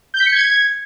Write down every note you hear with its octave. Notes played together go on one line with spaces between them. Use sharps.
G6
B6
C#7
G#6